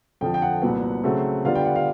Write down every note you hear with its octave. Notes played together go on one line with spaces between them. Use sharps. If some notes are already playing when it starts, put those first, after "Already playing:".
F2 D3 F3 G5
G5
F#5
C2 A#2 F#3 B3
C#3 F#3 A3 C4
D3 G3 B3 D4 F4 F5
G5
F#5
F5